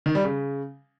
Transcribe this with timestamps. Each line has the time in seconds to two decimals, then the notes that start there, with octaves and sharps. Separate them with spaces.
0.06 D#3
0.15 G3
0.24 C#3